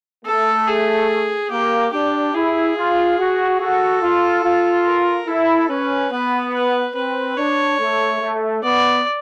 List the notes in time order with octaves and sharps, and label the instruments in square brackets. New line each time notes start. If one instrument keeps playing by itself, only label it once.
[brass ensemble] A3 [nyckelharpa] A4
[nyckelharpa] G#4
[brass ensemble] A#3 [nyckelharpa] G4
[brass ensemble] D4 [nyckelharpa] G4
[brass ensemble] E4 [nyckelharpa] G#4
[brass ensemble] F4
F#4
[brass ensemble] F#4 [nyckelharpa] A4
[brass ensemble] F4
F4
[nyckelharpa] A#4
[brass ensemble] E4 [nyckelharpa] A4
[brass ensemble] C#4 [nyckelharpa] B4
[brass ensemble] B3 [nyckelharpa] B4
[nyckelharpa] B4
[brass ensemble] C4 [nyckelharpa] B4
[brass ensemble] D4 [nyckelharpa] C#5
[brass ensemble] A3
A3
[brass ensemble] B3 [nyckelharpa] D5